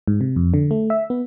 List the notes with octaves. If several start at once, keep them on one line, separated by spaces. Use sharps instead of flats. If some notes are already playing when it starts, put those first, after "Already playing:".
G#2
C3
F2
D3
A3
E5
B3